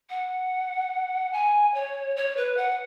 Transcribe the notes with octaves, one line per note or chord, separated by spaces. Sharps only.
F#5
G#5
C#5
C#5
B4
F#5